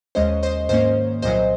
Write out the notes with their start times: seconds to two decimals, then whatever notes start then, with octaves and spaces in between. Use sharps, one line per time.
0.15 D#2 C#3 G#3 C#4 C5 D#5
0.43 C5 D#5
0.69 G#2 D#3 A#3 C#4 C5 D#5
1.22 C2 A#2 F#3 C5 D#5